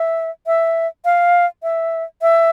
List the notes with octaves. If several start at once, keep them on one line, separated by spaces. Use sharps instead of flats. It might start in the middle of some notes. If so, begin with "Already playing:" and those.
Already playing: E5
E5
F5
E5
E5